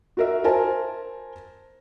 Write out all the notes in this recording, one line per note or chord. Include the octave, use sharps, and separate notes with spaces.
F#4 A#4 E5
A#4 C5 G#5 A5